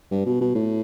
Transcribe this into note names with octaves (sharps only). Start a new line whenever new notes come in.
G2
B2
B2
A2